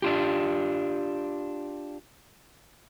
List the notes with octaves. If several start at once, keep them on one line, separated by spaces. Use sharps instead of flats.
D4 F4 G4